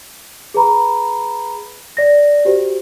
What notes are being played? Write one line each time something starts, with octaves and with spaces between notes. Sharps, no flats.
G#4 B4 A#5 B5
D5 A#6
F#4 G4 C5